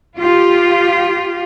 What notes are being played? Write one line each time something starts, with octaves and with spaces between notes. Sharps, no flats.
F4 G4